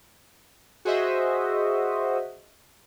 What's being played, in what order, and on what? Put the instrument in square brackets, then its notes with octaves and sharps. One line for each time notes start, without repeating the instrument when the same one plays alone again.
[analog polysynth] F#4 G#4 C5 D#5 E5